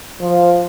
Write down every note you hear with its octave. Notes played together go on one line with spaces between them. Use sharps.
F3